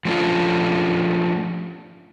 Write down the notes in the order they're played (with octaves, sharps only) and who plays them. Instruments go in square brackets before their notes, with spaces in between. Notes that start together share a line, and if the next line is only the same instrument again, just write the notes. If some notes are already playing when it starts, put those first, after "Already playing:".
[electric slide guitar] F3 A3 C#4 D4 F4